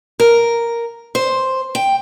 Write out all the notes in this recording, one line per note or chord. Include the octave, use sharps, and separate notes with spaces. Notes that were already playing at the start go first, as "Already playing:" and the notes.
A#4
C5
G5